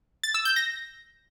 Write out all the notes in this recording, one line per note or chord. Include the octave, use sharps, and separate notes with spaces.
A6
E6
G6
A#6